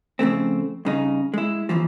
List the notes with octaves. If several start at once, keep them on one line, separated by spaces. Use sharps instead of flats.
F2 C#3 A3 C4
G2 C#3 D#4
G#3 E4
D#2 A#2 E3 F3